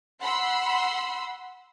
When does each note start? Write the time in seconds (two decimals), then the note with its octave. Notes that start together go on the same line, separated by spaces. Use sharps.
0.20 F#5 B5 C6 E6